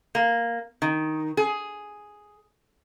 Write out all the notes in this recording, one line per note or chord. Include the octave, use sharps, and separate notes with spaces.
A#3
D#3
G#4